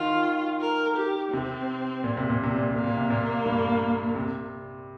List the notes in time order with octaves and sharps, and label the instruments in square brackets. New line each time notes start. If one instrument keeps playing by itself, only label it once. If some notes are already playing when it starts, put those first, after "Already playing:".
Already playing: [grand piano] D#3 [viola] F4
[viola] A#4
G4
[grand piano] C3 [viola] C4
[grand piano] A#2
C3
A#2
C3
A#2
[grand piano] C3 [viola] A#3
[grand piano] A#2
C3
A#2
G2
C3